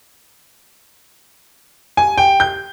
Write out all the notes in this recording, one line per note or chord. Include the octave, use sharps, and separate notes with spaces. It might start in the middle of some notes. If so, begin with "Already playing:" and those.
G#5
G5
G6